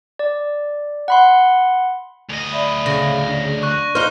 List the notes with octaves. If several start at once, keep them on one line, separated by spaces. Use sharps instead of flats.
D5
F#5 B5 C6
D2 D#5 F7
D5 E5 B5
C#3 A#6
D4 D5
C#6 F#6
D#4 C5 F6 G7